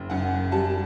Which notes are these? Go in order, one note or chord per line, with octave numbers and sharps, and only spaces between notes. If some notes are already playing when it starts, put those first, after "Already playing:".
Already playing: F#1
F#2 F#5
G3 A5